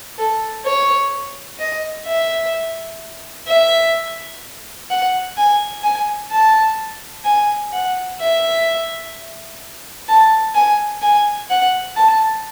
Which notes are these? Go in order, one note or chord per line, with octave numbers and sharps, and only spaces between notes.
A4
C#5
D#5
E5
E5
F#5
G#5
G#5
A5
G#5
F#5
E5
A5
G#5
G#5
F#5
A5